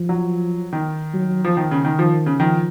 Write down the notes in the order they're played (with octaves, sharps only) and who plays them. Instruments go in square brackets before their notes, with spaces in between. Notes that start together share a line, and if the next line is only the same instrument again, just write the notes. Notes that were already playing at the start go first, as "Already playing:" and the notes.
Already playing: [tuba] F3
[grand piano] F#3
D#3
[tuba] F#3
[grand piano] F3
D#3
C#3
D#3
[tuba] D#3 [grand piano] F3
[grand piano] C#3
[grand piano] D#3 [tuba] F3